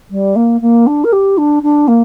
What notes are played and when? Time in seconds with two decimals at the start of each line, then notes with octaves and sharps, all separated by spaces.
0.10 G3
0.35 A#3
0.61 A#3
0.86 D4
1.04 A#4
1.12 G4
1.37 D4
1.62 D4
1.87 A#3